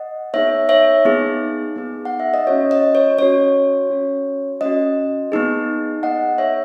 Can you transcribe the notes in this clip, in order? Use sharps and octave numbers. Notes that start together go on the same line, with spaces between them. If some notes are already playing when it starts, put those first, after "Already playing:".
Already playing: D#5 F#5
B3 D#4 G#4 C#5 E5
C#5 E5
B3 D#4 G#4
B3 D#4 G#4
F#5
E5
D#5
C#4 F#4 C#5
D#5
C#5
C#4 F#4 C#5
C#4 F#4
C#4 F#4 D#5
B3 D#4 G#4
B3 D#4 G#4 D#5 F#5
C#5 E5